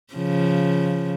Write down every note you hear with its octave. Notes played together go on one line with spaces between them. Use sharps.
C#3 F3